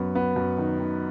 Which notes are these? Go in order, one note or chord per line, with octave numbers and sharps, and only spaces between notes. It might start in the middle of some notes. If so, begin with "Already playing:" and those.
Already playing: F#2 B3
B3
F#2
D#3
D#3